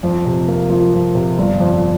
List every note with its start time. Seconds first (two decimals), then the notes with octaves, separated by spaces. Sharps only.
0.03 F2
0.26 C3
0.48 A#3
0.70 F3
0.93 F2
1.15 C3
1.38 G1
1.60 F2